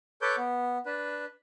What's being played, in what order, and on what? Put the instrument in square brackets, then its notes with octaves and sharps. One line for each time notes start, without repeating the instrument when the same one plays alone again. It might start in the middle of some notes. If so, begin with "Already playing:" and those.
[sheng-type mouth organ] A4 B4 C#5 D6 G6
B3
D4 B4